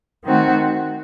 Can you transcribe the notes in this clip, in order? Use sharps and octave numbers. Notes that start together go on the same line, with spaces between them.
D#3 A3 C4 F#4